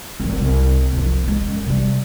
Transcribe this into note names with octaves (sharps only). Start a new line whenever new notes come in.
G#1 F#3
C2
C2 F3
G3 G#3
F#2
C3 G3